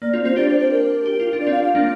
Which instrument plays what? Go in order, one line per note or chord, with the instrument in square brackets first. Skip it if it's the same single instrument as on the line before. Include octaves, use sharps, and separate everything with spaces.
[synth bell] A#3 [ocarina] D5
[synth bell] C4 F4
[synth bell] C4 F4 [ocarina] C5
[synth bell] D4 G4 [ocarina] D5
[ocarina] C5
C5
A#4
[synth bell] G4
F4
D4
[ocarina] D5
[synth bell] C4 F4 [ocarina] F5
[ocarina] F5
[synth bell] A#3 D4